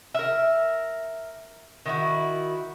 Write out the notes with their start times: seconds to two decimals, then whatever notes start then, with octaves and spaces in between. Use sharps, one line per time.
0.14 A#4 E5
1.86 D#3 E4 F#4